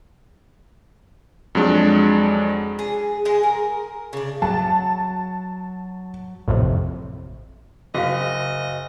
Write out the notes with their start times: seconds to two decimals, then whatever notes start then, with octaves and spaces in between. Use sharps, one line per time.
1.55 F2 F#3 G#3 D4
2.79 G#4
3.25 G#3 G#4 D#5
3.43 A#4
4.13 C#3 D4
4.42 F#3 A5
6.48 A1 F2 A2 C3
7.95 F#1 F#4 D#5 F5